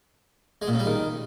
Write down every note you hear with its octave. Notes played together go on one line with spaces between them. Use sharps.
G#3
A#2
C#3
G3
D#3